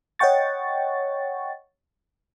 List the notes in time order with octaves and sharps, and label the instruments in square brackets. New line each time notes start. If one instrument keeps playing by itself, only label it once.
[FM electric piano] C#5 D#5 F#5 G5 C#6 A6